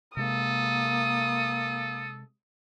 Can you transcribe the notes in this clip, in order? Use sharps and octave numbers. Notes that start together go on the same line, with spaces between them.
C3 G#3 A#3 A4 D#6